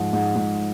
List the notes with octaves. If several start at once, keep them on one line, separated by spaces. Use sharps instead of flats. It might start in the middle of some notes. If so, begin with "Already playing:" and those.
Already playing: G#2 F3
G#2
G#2